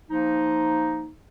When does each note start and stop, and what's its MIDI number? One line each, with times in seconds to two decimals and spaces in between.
0.10 1.10 53
0.10 1.10 58
0.10 1.10 63